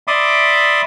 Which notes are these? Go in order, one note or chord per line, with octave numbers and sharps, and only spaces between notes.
D5 E5 B5 C6 D6 D#6